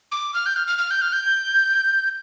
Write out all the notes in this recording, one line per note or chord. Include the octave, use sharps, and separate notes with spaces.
D6
F6
G6
F6
F6
F6
G6
F6
G6